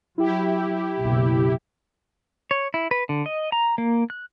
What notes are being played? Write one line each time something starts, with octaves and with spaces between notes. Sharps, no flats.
F#3 E4 G4
F#1 B1 B2
C#5
E4
B4
D3
D#5
A#5
A#3
F#6